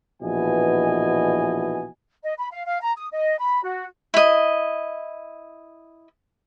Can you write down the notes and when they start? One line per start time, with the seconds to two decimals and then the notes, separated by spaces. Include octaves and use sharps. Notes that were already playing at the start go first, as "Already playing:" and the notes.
0.21 A#1 B2 E3 D#5 G#5
2.23 D#5
2.38 B5
2.51 F5
2.65 F5
2.81 A#5
2.97 D#6
3.12 D#5
3.39 B5
3.63 F#4
4.14 E4 D#5